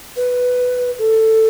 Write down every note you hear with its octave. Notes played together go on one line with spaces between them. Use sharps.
B4
A4